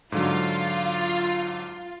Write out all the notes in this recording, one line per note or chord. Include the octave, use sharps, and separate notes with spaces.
G#2 D3 F#3 F4